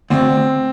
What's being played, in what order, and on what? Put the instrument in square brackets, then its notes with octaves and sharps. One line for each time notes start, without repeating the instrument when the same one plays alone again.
[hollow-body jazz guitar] D2 [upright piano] C4